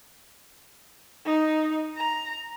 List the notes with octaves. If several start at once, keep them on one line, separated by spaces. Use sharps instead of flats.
D#4
A#5